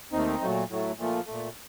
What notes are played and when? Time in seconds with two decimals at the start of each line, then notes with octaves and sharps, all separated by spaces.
0.12 D#2 D#3 A3 C4 D#4
0.41 A#2 F#3 A3
0.69 A2 F#3 A3
0.97 A#2 F3 A3
1.26 A#2 A3